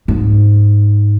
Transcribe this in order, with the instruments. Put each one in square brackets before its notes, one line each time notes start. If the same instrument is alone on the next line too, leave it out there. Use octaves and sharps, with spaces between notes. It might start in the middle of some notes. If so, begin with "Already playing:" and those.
[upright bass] G#2